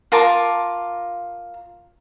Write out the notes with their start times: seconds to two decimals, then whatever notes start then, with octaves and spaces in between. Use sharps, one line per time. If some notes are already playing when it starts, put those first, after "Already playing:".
0.12 F4 A#4 A5 D6